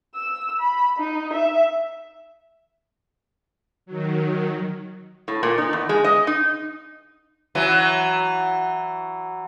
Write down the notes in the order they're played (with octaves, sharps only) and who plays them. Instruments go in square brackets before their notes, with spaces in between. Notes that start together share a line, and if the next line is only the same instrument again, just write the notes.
[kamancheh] E6
B5
D#4
E5
[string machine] D#3 F#3
[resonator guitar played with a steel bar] A2
A#2
D#4
E2
G#3
D#5
D#4
[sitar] E3 F#3